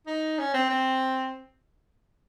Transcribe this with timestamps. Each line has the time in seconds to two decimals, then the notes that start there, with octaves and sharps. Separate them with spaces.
0.07 D#4
0.38 C#4
0.54 C4
0.70 C4